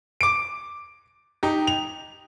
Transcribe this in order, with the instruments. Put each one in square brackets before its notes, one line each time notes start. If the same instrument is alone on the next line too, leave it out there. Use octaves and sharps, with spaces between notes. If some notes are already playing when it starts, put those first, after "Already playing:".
[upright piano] D6 D7
D#4 G4
F7